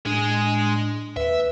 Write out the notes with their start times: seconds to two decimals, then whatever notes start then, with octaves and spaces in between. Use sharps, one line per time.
0.06 A2 G#3 D4 G#4
1.16 D#2 B4 E5